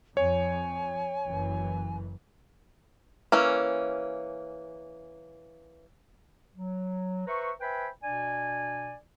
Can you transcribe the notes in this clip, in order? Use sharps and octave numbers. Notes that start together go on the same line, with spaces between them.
F2 C#5 G#5
F#1 F#2 E3
E3 A#3 C#4
F#3
B4 C5 E5 A#5 C#6
B4 C5 E5 G5 G#5 B5
B2 D4 D5 G#5